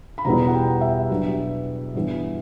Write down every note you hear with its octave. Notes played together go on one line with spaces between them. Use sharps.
B5
E2 B2 G3 B3 E4 A#5
F#5
G5
E5
B2 F#3 B3 D4
G2 E3 B3